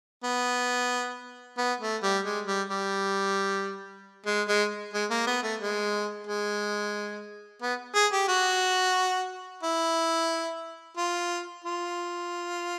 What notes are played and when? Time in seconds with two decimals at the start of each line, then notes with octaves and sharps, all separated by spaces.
0.24 B3
1.58 B3
1.81 A3
2.03 G3
2.25 G#3
2.47 G3
2.69 G3
4.26 G#3
4.48 G#3
4.93 G#3
5.10 A#3
5.27 B3
5.43 A3
5.60 G#3
6.27 G#3
7.62 B3
7.95 G#4
8.12 G4
8.28 F#4
9.63 E4
10.97 F4
11.64 F4